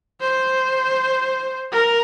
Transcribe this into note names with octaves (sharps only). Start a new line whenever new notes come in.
C5
A#4